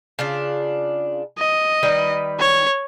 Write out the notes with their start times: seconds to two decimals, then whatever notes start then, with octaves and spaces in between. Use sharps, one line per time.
0.19 C#3 D4 F4
1.38 D#5
1.83 D#3 G3 B4
2.40 C#5